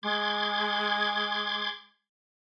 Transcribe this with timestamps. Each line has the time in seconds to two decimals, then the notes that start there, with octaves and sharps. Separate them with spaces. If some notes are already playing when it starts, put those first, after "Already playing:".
0.03 G#3 C6 D6 G#6